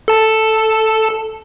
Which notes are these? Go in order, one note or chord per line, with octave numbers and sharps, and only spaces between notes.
A4 A5